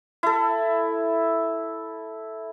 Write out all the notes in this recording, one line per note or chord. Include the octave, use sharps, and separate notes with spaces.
E4 A4